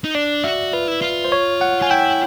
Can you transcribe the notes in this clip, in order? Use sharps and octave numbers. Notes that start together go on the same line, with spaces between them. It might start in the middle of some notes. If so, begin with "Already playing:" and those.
D#4
D4 D5
F#4 E5
F4 B4
E4
F4
C5
C#5
F#5
F4 G#5
E4 G5